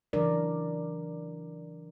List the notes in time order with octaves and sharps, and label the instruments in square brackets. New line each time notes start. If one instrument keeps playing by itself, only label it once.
[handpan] C#3 E3 F#3 D4 A#4 D5